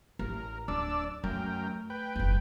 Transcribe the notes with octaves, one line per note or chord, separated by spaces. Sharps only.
A1 A#4
D1 D4 D5 E6
F#2 A3 A#4 G5
B4 G5
F#1 E2